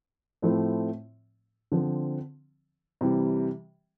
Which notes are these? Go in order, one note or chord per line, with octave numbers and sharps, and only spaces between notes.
A2 F3 A3 C4 E4
D3 F3 C4
C3 E3 G3